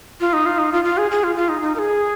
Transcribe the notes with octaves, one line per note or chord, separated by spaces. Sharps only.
F4
D#4
F4
D#4
F4
F4
G#4
G#4
F4
F4
D#4
D#4
A#4
G#4